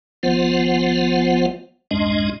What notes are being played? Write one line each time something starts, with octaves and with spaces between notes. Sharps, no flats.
G#1 F3 B3 F4 C5 F#5
C2 F2 G#2 G#3 D4 D#5